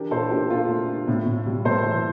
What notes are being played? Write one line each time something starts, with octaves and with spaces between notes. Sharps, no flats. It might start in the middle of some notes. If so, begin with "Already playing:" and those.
Already playing: E3 D4 G4 A#4
A#2 A4 C5
D4 G4 A#4
D4 F4 A4
A3
D4
A2
A2
G3
A2 A4 C5
E3